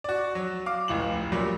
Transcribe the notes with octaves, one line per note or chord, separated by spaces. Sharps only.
F#4 D5
F#3
F5 D6
F1 C#2 A2 F#7
A#2 F#3 G3